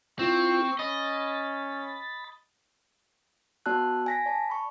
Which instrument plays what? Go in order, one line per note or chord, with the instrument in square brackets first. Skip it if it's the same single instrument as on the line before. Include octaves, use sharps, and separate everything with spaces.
[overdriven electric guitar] C4 [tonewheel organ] E4 F4 [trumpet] C#6
[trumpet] C#4 [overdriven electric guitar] D#5 [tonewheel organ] B5 A6
[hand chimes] B3 F#4 D5 A5 E6 F#6
G#5 A#6 B6
D5 A5
B5 C#6